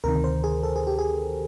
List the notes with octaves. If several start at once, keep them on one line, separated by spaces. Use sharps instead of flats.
D2 C3 D#3 A#4
C5
G#4
A4
G#4
G4
G#4